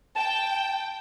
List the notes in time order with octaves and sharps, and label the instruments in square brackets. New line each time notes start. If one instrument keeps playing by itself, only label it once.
[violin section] G5 [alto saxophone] A5